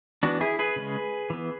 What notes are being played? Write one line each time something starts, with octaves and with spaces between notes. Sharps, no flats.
E3 B3 D4 F#4
E4 G#4
G#4 B4
C#3 G#3 C#4
E3 B3